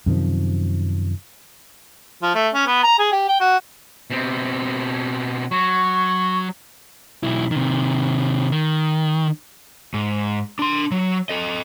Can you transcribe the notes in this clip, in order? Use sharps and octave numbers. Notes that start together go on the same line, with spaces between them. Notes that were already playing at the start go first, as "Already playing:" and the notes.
F#2 C3 D#3 F3
F3
A3
C#4
B3
A#5
G#4
G4
G5
F#4
B2 C4
F#3 C#6
B1 E4
C3 D#3
D#3
G#2
D4 C6
F#3
A4 D#5